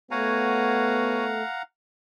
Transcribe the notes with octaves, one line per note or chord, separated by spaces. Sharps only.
A3 B3 F#4 C#5 F5 F#5 G#5 A#5